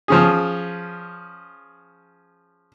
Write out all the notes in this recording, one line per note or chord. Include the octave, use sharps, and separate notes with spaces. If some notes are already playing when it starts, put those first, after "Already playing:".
F3 C#4 G#4